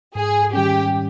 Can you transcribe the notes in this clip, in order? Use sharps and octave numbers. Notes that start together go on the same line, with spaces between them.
G#2 G#4
D#3 G3 C#4 G4